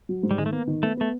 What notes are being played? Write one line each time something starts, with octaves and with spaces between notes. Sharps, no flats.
F#3
G#2
G3
D#3 G#3
A3
A#3 B3
D#3
A3 B3
A3 B3